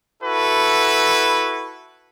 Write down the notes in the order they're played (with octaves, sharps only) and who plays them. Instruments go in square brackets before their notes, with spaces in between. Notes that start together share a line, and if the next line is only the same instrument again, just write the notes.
[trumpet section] E4 F#4 A4 B4